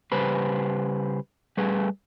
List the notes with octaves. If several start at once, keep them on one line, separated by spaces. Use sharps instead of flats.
C#3 G3 G4 B4 C5
G3 A3 G#4 B4